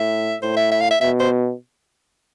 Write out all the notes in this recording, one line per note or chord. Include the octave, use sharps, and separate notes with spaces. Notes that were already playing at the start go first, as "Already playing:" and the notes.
Already playing: A2 E5
A2 C5
E5
E5
F5
E5
B2 E5
C5